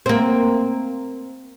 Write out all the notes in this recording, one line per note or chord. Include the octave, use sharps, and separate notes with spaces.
A#3 C4